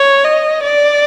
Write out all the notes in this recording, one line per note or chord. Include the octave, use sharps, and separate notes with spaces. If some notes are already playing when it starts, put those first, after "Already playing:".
Already playing: C#5
D#5
D5